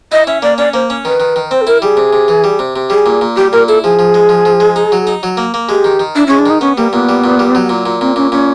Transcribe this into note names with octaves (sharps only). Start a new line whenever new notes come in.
E4 D#5
C#4 E5
A#3 D5
C#4 D5
A#3 C5
C#4
D#3 B4
D#3
D#3
C4 C5
A4
E4 A#4
G3 G#4
C3
C3
E3
G3
C3
C3
G3 G#4
A#2
A#2
G3 G4
A#2 A#4
E4 A4
F3 G#4
F3
G#3
F3
F3
G#3
D#4
F#3
D#4
F#3
A#3
A#3
G#3 G4
D#3
D#3
D4 E4
G#3 C#4
D4
D#3 D#4
B3 C#4
G3 A#3
A#2 B3
G3
A#2
G3
F#3
A#2
A#2
A#2 C4
A#2 C#4
A#2 C#4